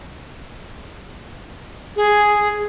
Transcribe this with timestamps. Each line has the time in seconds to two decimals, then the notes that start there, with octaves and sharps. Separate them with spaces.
1.96 G#4